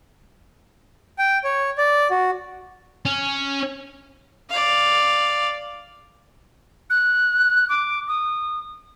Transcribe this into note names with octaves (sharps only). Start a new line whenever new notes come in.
G5
C#5
D5
F#4
C#4
D5 F5
F#6
D6
D#6